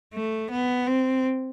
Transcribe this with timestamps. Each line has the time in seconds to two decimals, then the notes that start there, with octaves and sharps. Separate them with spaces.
0.14 A3
0.51 B3
0.87 C4